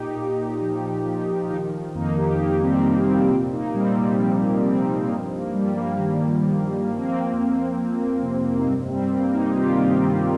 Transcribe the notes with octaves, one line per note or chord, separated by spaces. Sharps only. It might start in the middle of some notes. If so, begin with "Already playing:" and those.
Already playing: A#2 D#4 G4
A#2
F3
F3
F4
D#3 D#4 G4
F2 A#3 D#4
D#4 G4
F2 A#3 D#4
G3 C4
C3 A#3
G3 C4
A#2 C4 F4
A#3 D#4
A#3
A#2 G3 C4
G3 C4
F3 A#3
F3 G3 C4
G2 A#3 D#4
A#3
G2 G3
A#3
D#3
D#3
F3 A#3
C4
A#3
F2
F2
C3
D#4
G2 G3 C4
G3 C4
G2 A#3
A#3 D#4
G4
D#3 C4 F4
D#4
G3 C4
C4
D#3 A#3